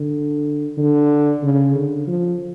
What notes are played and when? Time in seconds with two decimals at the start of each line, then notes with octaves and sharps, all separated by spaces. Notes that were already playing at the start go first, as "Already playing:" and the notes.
Already playing: D3
0.77 D3
1.43 C#3
1.75 D3
2.07 F3